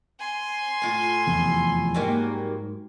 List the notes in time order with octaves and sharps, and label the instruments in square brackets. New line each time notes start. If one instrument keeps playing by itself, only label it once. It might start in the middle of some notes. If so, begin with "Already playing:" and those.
[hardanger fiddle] G#5 C6
[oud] A2 F4
[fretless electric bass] F1 E2
[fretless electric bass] G#2 [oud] F#3 G3 A#3